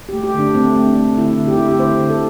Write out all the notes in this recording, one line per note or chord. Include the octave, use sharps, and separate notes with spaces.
A3 G4
G4
D3 D4
A3 C4
A3
D4
A3
D3 E4
D3
G4
A3 E4
G4
D3 C5
D3
A4